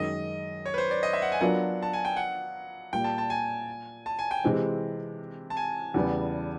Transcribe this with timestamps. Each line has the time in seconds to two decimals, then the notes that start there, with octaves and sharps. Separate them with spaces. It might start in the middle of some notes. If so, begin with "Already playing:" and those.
Already playing: F#2 D#3 G#3 D#5
0.66 C#5
0.74 B4
0.78 C5
0.91 D5
1.03 D#5
1.13 E5
1.22 F#5
1.32 G#5
1.41 F#3 B3 D4 F4 A#4 F#5
1.83 A5
1.93 G#5
2.05 G5
2.16 F#5
2.93 A#2 G3 A#3 G5
3.04 A5
3.18 A5
3.30 G#5
4.06 A5
4.19 G#5
4.31 G5
4.44 C3 E3 G#3 C4
5.50 A5
5.57 G#5
5.94 E2 C#3 E3 G3 B3